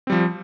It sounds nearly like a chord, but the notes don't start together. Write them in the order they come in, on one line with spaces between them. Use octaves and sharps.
C4 G3 F3